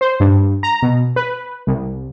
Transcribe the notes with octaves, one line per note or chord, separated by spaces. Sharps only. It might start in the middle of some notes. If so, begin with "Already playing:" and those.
C5
G2
A#5
B2
B4
C2